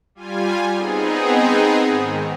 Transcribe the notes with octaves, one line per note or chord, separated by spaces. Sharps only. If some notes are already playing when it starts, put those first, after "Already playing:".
G3 F4 G#5
B3 C4 D#4 G#4
G#2 D#3